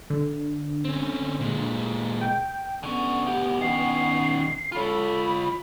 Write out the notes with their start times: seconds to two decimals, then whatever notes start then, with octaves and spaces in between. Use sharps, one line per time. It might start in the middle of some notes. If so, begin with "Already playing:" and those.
0.10 D3
0.85 C4 C#4
1.40 A#2 G#3
2.21 G5
2.83 D3 B3 C#4
3.26 D2 G4
3.61 D#3 C#4 C7
4.72 F4 A4 C#5 B5